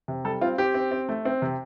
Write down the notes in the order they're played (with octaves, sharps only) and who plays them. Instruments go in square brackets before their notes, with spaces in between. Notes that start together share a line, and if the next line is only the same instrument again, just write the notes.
[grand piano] C3
G3 A4
C4 F4
C4 G4
C4
C4
A3
C4
C3